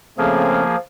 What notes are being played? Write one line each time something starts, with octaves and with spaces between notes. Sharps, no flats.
C#3 F3 A3 A#3 C4 G#4